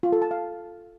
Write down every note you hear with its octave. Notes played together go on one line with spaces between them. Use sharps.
F4
A4
A5
F5